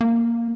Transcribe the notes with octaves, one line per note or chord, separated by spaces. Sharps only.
A#3